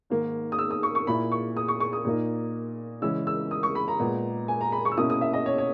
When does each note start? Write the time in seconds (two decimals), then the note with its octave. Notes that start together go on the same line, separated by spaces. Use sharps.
0.10 G#2 D#3 A#3
0.52 D#6
0.59 E6
0.71 D#6
0.83 C#6
0.95 C#6
1.07 A#2 A#3 E4 B5
1.32 C#6
1.57 D#6
1.68 C#6
1.80 C#6
1.93 D#6
2.05 A#2 A#3 D#4
3.02 C#3 E3 G#3 C#4 E6
3.27 E6
3.51 D#6
3.63 C#6
3.75 B5
3.88 A#5
4.00 A#2 G#3 B3
4.48 G#5
4.61 A#5
4.72 B5
4.85 C#6
4.92 E6
4.97 B2 A#3 C#4 E4 D#6
5.10 D#6
5.21 E5
5.33 D#5
5.46 C#5
5.58 C#5